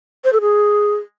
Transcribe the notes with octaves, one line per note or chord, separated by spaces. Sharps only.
C5
A4
G#4